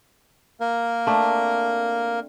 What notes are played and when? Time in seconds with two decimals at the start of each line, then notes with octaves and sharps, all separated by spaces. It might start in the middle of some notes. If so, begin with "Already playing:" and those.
0.60 A#3 A#4
1.07 A3 C4 D4